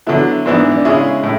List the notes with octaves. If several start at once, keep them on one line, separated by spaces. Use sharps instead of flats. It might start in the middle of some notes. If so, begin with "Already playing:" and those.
D3 F#3 B3 E4
G#2 E3 B3 D4
D4
C#3 G#3 C#4 E4 G#4
A2